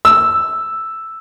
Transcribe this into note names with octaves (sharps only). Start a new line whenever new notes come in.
E6